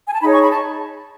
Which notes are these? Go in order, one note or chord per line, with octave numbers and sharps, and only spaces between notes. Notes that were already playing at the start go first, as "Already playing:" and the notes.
G#5
A5
D#4 G#4 C#5 B5
C#6
B5
A5